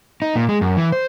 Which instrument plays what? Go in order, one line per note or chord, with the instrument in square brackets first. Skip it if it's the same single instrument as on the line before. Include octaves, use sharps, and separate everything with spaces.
[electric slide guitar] D#4
A#2
G#3
F#2
E3
C5